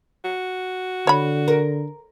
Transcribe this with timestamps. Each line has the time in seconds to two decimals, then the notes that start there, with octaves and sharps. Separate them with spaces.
0.25 F#4
1.07 D3 C#5 B5
1.48 A#4